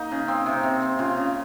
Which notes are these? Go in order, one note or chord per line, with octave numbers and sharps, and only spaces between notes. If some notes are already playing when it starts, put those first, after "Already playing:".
Already playing: A#3 D#4
C#3
C4
C3
C3
C4
C#3 F4
C#3